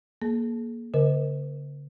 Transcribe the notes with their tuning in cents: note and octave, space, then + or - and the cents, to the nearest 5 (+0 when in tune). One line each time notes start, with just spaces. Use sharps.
A#3 +5 G#4 +40
D3 -40 A#4 +0 D#5 +25